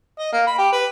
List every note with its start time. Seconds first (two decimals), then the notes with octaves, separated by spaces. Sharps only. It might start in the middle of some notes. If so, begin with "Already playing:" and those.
0.19 D#5
0.33 A#3
0.47 B5
0.58 G4
0.72 B4